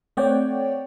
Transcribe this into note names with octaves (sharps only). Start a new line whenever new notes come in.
A3 C4 C#5 D5 F#5 G5